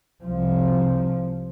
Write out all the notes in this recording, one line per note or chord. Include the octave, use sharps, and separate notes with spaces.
C2 F3